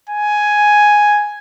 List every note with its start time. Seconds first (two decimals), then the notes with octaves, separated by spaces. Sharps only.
0.09 G#5